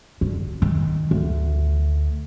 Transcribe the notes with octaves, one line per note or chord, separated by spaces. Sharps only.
D3
D#3
D2